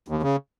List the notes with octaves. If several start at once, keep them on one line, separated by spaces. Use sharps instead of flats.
D#2
C#3